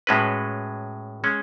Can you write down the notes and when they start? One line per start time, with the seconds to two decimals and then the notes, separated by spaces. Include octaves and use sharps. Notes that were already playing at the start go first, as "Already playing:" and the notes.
0.07 A2 G#3 C#4 F#4 B4
1.24 G#3 C#4